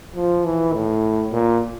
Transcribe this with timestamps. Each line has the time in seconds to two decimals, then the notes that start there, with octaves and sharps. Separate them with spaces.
0.15 F3
0.45 E3
0.74 A2
1.32 A#2